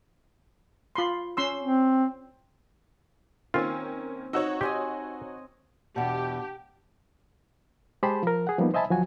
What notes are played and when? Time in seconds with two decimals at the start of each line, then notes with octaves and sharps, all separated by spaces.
0.96 F4 B5 C6
1.37 C#4 C6 E6
1.61 C4
3.54 D#3 A#3 C4 C#4 F4
4.33 D#4 F#4 C#5 E6
4.61 G4 D#5 G#5 C6
5.96 E2 B2 D4 G4 F#5 A5
8.03 G#3 G4 G#4 C5 A5 B5
8.23 F3 A#4
8.47 G#4 F#5
8.58 F3 G3 A#3 B3 D#4
8.74 C5 D#5 E5 G#5 A5 B5
8.90 D2 F3 F#3 F#4 G#5